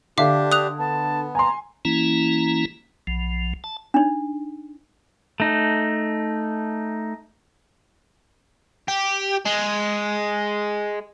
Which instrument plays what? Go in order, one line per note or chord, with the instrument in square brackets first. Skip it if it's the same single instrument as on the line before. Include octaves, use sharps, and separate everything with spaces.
[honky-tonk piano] D3 [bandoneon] D4 G4 [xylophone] E5 F5 D6
[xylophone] D#6 F#6 F7
[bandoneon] B3 [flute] A5
[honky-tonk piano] G#5 C6 [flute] A#5
[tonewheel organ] E3 A#3 C#4 E4 A#5
B1 F3
A5
[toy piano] D4 D#4
[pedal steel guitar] A3 D#4
[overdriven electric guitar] G4
G#3